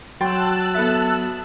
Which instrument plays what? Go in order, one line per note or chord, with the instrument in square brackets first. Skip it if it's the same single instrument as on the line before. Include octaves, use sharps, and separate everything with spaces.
[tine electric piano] F#3 F#4 A6 [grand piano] G5 C6 [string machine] A5 E6 F#6
[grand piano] B3 A4 E5